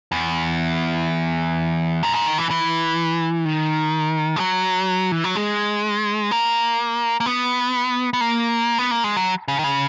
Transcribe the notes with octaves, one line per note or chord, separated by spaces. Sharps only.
E2
F#2
G#2
D#3
E3
E3
D#3
G#3
F#3
E3
F#3
G#3
A#3
A#3
B3
B3
A#3
B3
A#3
G#3
F#3
C#3
D#3
C#3